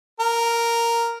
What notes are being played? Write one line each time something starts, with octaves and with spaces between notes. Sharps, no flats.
A#4